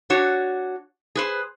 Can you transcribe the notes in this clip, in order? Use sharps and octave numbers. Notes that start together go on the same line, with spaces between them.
D4 F#4 C#5
G#4 B4 C5